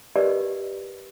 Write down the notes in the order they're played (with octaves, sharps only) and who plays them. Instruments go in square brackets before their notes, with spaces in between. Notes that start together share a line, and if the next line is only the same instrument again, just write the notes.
[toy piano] G4 A#4 B4 D5 D#5